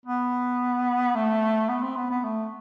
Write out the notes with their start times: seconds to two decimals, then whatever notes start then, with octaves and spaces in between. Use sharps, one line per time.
0.06 B3
1.15 A3
1.69 B3
1.83 C4
1.96 B3
2.10 B3
2.24 A3